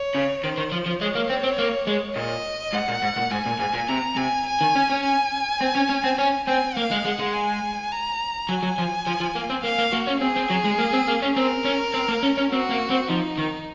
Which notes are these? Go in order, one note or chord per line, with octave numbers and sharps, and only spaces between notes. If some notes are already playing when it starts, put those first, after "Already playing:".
Already playing: C#5
C#3
D#3 C5
D#3
F3
F3
G#3 C#5
A#3
C4
C4
A#3
G#3
A#2 D#5
G#2 F#5
A#2
G#2
A#2
G#2 G#5
A#2
G#2
A#2
C3 A#5
C3 G#5
G#5
D#3
C#4
C#4
G#5
C4
C#4
C#4
C4
C#4 G#5
C4 G#5
A#3 F5
G#3
G#3 F#5
G#3
G#5
A#5
F#3 G#5
F#3
F3
F3
F3
A#3
C4
A#3 F5
A#3
A#3 F#4
C#4
C4 G#4
C4
F#3
G#3
A#3
C4
A#3
C#4
C4 A#4
C#4
C4
A#3
C#4
C#4
C4 F#4
A#3
C4
F3 D#4
D#3